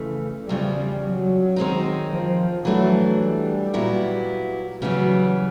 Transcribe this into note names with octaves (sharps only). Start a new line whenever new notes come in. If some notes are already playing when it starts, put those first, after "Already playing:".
Already playing: F2 C#3 E3 A3
E2 C#3 F3 G3
F#3
D#3 G#3 C4 D#4
F3
E3 F#3 A3 D4
G3
A#2 F#3 B3 E4
C#3 E3 F#3 G3 B3